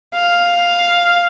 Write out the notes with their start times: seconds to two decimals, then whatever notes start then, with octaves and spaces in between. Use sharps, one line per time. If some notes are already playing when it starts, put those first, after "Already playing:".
0.15 F5